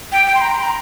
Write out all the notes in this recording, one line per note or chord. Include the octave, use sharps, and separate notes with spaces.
G5
G5
C6
A#5
C6
A#5